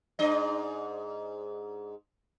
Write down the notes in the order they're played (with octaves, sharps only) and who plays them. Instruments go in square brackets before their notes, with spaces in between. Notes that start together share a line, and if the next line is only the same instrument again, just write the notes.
[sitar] G#2 D4 D#5